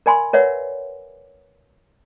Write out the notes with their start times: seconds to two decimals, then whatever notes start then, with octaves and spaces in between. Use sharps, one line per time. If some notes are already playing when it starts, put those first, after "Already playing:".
0.06 A#4 D5 G#5 B5 C6
0.33 A#4 B4 C#5 D5 E5 F#5